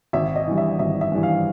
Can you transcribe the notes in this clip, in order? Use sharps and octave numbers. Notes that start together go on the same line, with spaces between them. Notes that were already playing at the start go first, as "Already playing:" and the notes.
G#1 E5
D#5
G2 E3
E5
G#1 E5
E5
G2 E3
F5